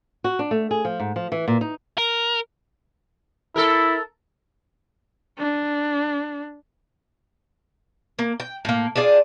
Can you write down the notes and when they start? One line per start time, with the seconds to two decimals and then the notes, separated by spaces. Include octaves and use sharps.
0.24 F#4
0.39 D4
0.51 A3
0.71 G#4
0.85 F3
1.00 G#2
1.16 F3
1.32 E3
1.48 A#2
1.61 D#4
1.98 A#4
3.56 E4 A4 A#4
5.39 D4
8.19 A#3
8.40 G5
8.65 A2 A#3
8.96 D4 F4 G#4 D5